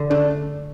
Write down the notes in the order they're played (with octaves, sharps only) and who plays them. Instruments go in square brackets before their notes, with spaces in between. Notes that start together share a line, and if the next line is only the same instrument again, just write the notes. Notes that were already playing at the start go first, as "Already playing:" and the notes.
Already playing: [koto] D3
[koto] A3 [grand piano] D4